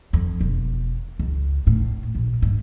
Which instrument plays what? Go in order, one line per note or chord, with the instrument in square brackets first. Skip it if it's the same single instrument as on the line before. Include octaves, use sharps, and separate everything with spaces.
[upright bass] F2
E1
C#2
A2
A#1
G#2